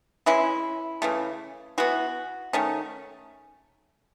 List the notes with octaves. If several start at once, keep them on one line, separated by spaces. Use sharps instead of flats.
E3 G#3 C#4 E4
C#3 E3 A3
E3 B3 F#4
D#3 A3 C#4